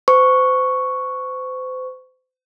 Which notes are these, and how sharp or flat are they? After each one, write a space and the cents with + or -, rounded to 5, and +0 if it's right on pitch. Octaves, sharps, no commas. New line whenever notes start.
C5 -35 C#6 +0